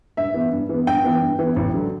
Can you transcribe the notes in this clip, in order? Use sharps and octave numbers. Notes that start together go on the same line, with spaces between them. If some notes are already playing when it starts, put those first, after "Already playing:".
G2 E5
E3 B3
G2
E3 B3
G2 G5
E3 B3
G2
E3 B3
A1
D3 F#3